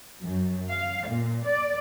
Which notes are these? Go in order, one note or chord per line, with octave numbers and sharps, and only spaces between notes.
F#2
F5
A#2
D5